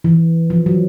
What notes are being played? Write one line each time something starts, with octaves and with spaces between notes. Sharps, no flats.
E3
F3
F#3